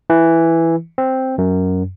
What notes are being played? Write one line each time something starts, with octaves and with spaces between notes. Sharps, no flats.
E3
C4
F#2